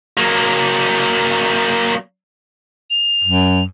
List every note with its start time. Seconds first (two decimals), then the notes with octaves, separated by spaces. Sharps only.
0.17 F#3 A#3
2.90 F7
3.24 F#2